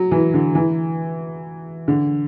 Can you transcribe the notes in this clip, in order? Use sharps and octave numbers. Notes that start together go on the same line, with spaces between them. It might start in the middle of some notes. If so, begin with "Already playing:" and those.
Already playing: F#3
E3
D3
E3
D3